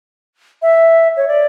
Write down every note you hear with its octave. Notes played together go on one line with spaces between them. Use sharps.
E5
C#5
D5